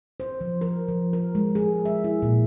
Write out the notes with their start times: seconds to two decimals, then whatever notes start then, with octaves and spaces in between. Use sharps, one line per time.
0.20 C5
0.41 F3
0.61 A#4
0.88 F3
1.13 A#4
1.35 G#3
1.55 G#4
1.85 E5
2.04 E4
2.22 A#2